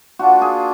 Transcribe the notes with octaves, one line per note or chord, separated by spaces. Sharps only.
A#3 D4 F4 F#4
G#4